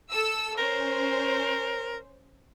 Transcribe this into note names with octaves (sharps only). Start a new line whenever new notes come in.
A4 E6
C#4 A#4 C5